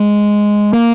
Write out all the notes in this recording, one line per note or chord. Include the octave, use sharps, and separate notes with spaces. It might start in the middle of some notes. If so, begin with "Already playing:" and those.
Already playing: G#3
A#3